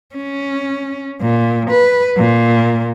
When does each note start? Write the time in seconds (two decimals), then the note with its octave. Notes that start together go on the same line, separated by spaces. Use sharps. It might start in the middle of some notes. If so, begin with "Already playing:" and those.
0.15 C#4
1.22 A#2
1.71 B4
2.17 A#2